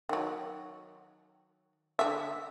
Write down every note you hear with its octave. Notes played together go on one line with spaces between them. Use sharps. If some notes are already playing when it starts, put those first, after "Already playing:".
D#3 F#3
D3 E5